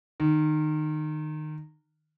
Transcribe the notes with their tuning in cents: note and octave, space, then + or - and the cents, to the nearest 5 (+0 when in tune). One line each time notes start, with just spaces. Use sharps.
D#3 -20